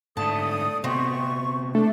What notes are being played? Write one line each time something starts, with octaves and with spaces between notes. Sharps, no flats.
G#2 D3 A3 A4 D5 A5 D#6
C3 A3 B3 C4 C#6
A3 D4